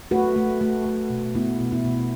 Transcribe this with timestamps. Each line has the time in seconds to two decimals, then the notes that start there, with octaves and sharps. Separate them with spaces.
0.11 A3 F#4 B4
0.36 A3
0.61 A3
0.86 A3
1.10 B2
1.35 A3 B3 E4
1.60 B2
1.72 B3 E4
1.85 B2